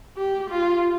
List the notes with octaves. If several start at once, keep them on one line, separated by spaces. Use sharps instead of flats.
G4
F4